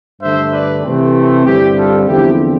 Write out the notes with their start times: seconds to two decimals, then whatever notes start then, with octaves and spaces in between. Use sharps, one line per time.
0.21 G2 D3 A3 C5 E5
0.52 B4 D5
0.84 C3 E3 A3 C4
1.46 G2 D3 G3 C4 E4 G4
1.77 F4 A4
2.08 E2 D3 F3 C4 E4 G4